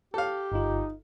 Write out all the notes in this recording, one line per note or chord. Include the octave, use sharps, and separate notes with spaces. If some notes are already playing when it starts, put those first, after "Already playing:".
G4 A4 F5
G1 D#4 F4